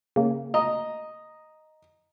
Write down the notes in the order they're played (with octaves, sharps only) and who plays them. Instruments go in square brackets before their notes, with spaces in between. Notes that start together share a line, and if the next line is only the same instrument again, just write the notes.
[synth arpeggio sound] C#3 A#3
[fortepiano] D#5 A#5